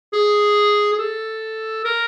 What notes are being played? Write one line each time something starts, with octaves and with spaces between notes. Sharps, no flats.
G#4
G#4
A4
A#4